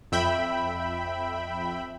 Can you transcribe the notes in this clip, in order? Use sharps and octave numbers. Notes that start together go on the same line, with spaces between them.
F2 E5 G5 B5